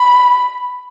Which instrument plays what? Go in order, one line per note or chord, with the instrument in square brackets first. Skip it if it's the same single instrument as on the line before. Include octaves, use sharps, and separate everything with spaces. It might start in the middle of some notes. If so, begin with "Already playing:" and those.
Already playing: [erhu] B5